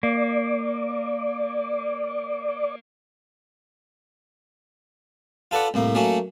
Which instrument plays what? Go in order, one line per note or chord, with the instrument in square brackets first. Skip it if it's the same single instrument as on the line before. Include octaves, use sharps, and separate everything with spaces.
[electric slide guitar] A#3 [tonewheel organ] D5
[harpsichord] F4 A4 B4 D5 F#5
C2 A2 A#3
F#3 A3 A#3 C#4 F#4